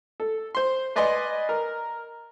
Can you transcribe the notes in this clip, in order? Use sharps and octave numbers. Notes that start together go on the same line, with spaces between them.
A4
C5 C6
B4 D5 D#5 G#5 C6
A#4